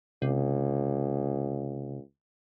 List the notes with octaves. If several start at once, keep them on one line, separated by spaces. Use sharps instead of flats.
C#2 C3